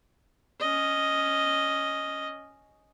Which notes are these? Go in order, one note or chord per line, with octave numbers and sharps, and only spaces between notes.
C#4 D#5